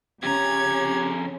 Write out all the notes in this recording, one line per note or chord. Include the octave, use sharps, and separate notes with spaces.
F2 C#3 C#4 G4 A#5 G#6